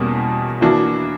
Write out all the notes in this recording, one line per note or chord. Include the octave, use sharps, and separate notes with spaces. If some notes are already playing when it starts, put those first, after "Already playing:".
Already playing: E2 B2 G3 A#3 C#4
E3 A#3 D4 F#4